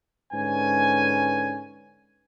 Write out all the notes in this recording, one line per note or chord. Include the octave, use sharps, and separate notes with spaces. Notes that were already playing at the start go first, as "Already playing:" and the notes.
G#2 D3 C#4 B4 G#5